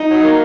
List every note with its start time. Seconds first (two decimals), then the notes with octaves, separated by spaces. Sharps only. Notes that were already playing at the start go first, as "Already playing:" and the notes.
Already playing: D#4
0.09 F#3
0.23 A#3